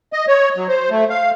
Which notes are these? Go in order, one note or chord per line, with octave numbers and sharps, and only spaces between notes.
D#5
C#5
F#3
C5
A3
F5